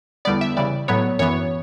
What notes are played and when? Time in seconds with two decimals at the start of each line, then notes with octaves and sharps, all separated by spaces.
0.25 E2 D3 G3 B3 D5
0.41 E5
0.57 C#3 E3 G3 D5
0.88 A2 F#3 B3 C#5
1.19 F#2 E3 B3 C#5